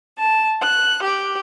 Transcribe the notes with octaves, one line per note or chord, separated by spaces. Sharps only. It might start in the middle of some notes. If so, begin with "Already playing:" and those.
A5
F#6
G4